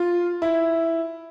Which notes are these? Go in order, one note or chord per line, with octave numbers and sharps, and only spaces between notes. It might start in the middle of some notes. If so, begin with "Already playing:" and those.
Already playing: F4
E4